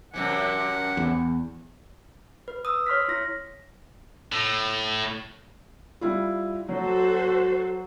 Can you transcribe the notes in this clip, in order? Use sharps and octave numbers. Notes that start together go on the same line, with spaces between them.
F#2 C3 E3 F#5
E2
B4
D#6 E6
C#5 C6 F6 B6
E4 A#6
A2
G3 E4 F4
F#3 F#4 A4 C5